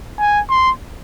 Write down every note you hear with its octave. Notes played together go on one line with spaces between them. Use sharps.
G#5
C6